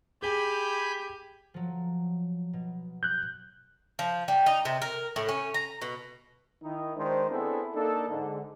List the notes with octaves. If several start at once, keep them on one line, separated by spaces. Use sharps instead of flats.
G4 G#4 G#5 B5 G6
F3 F#3
B2
F#6 G6
F3
G3
D#4
C3
A#4
A2
C#4
A#5
B2
D#3 D#4 E4
D#3 G#3 D4 C5
B3 C4 D4 E4 G#4 A4
A#3 D4 D#4 A4
G#2 D3